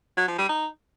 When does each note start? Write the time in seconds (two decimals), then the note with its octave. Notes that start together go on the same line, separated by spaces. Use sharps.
0.17 F#3
0.28 F3
0.38 G3
0.49 D#4